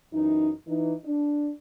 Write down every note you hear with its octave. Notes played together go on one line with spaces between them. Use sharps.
F#2 E3 D#4
E3 D#4
D4